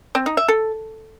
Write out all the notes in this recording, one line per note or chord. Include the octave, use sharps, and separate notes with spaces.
C4
D#4
E5
A4